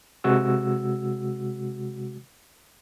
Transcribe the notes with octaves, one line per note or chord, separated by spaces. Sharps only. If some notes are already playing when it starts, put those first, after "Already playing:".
C3 G#3 F#4 E6